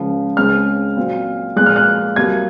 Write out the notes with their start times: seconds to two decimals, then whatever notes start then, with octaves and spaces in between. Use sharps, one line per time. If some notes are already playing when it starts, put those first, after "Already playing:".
Already playing: C#2 C#3 F3
0.37 C#2 C#3 G#3 C4 F6
0.97 A#2 F#3 C4
1.56 A#2 F3 G#3 F#6
1.66 F6
1.76 F#6
2.16 C2 C3 F#3 A#3 G#6